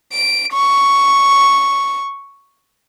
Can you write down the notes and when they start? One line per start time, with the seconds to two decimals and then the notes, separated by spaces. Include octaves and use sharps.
0.12 D7
0.53 C#6